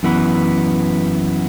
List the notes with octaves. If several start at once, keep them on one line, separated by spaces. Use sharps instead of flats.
F#2 E3 B3 B4